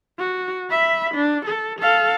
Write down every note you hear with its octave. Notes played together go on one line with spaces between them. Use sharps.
F#4
E5 B5
D4
A4
A4 F5